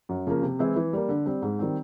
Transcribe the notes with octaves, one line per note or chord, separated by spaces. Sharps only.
F#2
C#3 F3 A#3
C3
E3 G#3 C4 E4
E3
G3 A#3
D3
G3 C4
G#2
D#3 G3 C4